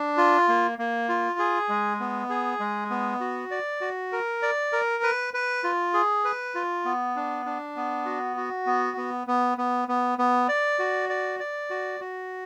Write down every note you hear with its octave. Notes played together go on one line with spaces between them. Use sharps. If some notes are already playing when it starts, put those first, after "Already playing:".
Already playing: D4
F4
A#3
A#3
F4
G#4
G#3
B3
G#4
G#3
B3
F#4
D5
F#4
A#4
D5
A#4
B4
B4
F4
G#4
B4
F4
B3
D4
D4
B3
F#4
F#4
B3
B3
B3
B3
B3
B3
D5
F#4
D5
D5
F#4
F#4